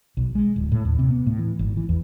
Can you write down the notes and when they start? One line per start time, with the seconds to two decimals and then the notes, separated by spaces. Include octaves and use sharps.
0.17 B1
0.35 G#3
0.56 D1
0.72 A2
0.85 D#2
0.99 C3
1.11 B3
1.26 A2
1.39 E3
1.59 G#1
1.77 E3
1.89 E2